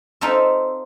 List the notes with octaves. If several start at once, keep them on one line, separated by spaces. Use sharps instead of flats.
C4 D#4 F4 A4 E5